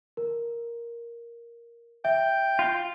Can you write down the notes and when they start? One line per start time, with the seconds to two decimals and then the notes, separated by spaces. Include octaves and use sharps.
0.17 A#4
2.05 E5 G5
2.59 F4